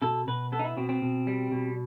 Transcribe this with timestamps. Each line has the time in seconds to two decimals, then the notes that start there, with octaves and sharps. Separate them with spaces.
0.02 B2 A4
0.27 B2 B4
0.52 B3 A4
0.59 D#4
0.64 E4
0.77 B2 C4
0.89 C4
1.02 B2
1.27 G3
1.52 B2